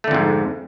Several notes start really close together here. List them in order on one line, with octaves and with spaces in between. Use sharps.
A3 D3 F2 G#2